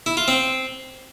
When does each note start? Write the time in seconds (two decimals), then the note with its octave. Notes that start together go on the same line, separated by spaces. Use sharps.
0.06 E4
0.17 F4
0.28 C4